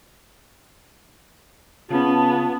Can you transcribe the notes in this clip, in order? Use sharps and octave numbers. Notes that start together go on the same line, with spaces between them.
C#3 B3 C#4 F4 A5